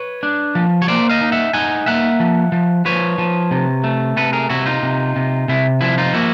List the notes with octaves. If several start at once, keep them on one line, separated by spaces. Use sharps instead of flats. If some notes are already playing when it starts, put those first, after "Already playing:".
Already playing: B4 C#5
D4
F3
C#5
A#3 C5 D5
D#5 F5
D#4
E5 F#5
D#4 F#5 G#5
A#3 E5 F#5
F3
F3
F3 B4 C#5
F3
C3
A3
C3 A4 B4
G#4 A#4
C3 E4 F#4
D#4 F4
C3
C3
C3 E4
F3 E4
D#4 F4
A#3 E4 F#4